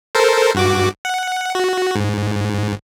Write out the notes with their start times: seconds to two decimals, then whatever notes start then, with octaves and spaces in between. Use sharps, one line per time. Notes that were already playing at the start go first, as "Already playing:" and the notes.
0.15 A4 A#4 C5
0.55 G2 F#4 D6
1.05 F#5
1.55 F#4
1.95 G#2